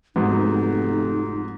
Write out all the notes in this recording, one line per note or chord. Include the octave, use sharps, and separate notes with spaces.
F1 G#2 F#3 B3 D#4